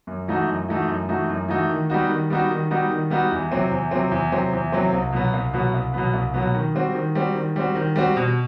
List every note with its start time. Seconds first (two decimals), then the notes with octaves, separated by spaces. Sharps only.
0.07 F#2
0.28 E3 A3 D#4 F#4
0.48 F#2
0.68 E3 A3 D#4 F#4
0.88 F#2
1.09 E3 A3 D#4 F#4
1.29 F#2
1.48 E3 A3 D#4 F#4
1.69 D#3
1.90 G3 B3 D#4 F#4
2.09 D#3
2.30 G3 B3 D#4 F#4
2.50 D#3
2.71 G3 B3 D#4 F#4
2.90 D#3
3.10 G3 B3 D#4 F#4
3.32 E2
3.52 C3 F#3 C4
3.71 E2
3.91 C3 F#3 C4
4.11 E2
4.32 C3 F#3 C4
4.53 E2
4.72 C3 F#3 C4
4.92 C2
5.12 B2 F#3 B3
5.33 C2
5.54 B2 F#3 B3
5.74 C2
5.94 B2 F#3 B3
6.14 C2
6.34 B2 F#3 B3
6.54 D#3
6.74 G3 C4 F#4
6.94 D#3
7.15 G3 C4 F#4
7.35 D#3
7.56 G3 C4 F#4
7.75 D#3
7.96 G3 C4 F#4
8.17 B2